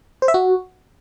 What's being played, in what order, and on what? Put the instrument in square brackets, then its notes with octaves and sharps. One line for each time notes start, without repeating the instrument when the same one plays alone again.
[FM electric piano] C5
E5
F#4